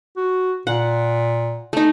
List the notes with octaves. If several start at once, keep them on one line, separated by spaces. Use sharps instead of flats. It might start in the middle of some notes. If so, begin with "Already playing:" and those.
F#4
A#2 F#5
A3 D#4